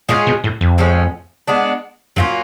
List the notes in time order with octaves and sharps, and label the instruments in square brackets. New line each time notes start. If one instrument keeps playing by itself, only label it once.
[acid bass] A#2 [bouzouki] G#3 C#4 F4 G#4
[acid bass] B2
A2
F2
[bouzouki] A2 F3 G#3 C#4
G#3 B3 D4
[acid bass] F#2 [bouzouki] F#3 A#3 C#4 F4